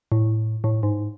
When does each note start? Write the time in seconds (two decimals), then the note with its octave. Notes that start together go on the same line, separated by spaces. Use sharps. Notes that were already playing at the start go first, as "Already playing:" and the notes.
0.12 A2
0.64 A2
0.83 G#2